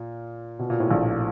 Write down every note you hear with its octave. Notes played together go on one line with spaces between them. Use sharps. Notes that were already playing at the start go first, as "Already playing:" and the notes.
Already playing: A#2
B2
A#2
A2
A#1 A#2